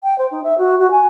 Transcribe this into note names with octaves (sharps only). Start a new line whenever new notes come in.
G5
C5
D#4
E5
F#4
F#4
G#5